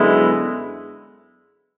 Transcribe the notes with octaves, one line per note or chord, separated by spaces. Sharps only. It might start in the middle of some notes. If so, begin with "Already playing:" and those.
Already playing: F#2 D3 G#3 B3 E4